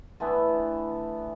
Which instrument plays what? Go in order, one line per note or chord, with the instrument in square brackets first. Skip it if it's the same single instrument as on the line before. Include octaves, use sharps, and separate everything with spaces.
[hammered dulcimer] D3 E3 A3 B3